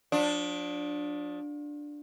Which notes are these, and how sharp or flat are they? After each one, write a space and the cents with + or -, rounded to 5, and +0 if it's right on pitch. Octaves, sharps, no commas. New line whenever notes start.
F3 +40 D4 +0